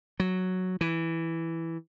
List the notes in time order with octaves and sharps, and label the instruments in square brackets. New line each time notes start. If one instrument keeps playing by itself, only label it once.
[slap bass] F#3
E3